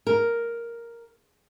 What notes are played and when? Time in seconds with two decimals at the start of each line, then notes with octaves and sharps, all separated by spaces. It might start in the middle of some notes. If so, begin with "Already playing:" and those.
0.07 A#4